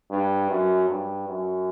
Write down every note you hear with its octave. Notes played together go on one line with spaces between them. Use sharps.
G2
F#2
G2
F#2